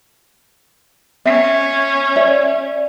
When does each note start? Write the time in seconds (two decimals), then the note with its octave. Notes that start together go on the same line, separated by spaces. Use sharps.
1.26 C#4 E5
2.16 C#5 D5 E5